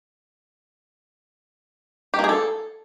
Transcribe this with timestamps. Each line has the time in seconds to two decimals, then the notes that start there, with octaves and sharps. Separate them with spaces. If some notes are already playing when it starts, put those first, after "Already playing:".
2.14 G4
2.19 A#3
2.24 G#4
2.29 A4